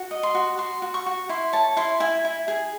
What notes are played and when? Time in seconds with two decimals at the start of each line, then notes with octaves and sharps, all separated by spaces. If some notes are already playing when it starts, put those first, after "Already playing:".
Already playing: F#4
0.11 D#5
0.23 C6
0.35 F#4
0.58 F#4 C6
0.82 F#4
0.94 C#6
1.06 F#4
1.29 E4 C6
1.53 C#5 A5
1.77 E4 C6
2.00 E4 G#5
2.25 E4
2.48 G#4